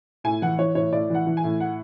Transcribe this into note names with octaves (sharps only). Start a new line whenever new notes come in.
A2 G#5
E3 F#5
E3 C#5
A2 C#5
A2 D5
E3 F#5
E3
G#5
A2
F#5